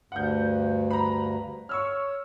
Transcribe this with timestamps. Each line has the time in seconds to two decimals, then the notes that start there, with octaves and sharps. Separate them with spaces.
0.12 D2 G2 F#5 G6
0.91 A#5 B5
1.69 C#5 C#6 E6 F6